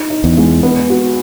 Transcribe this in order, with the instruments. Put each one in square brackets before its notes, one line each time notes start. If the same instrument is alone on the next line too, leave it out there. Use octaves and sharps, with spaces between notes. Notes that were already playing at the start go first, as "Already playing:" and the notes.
Already playing: [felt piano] D#4
D#4
[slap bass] E2
[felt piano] G#3
B3
F#4